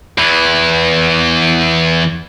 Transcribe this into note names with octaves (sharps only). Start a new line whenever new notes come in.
E2 E3